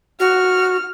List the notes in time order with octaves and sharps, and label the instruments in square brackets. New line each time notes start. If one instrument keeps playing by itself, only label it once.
[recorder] F#4 [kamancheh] F6